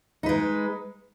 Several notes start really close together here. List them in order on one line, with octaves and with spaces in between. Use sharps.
D#4 B4 G#3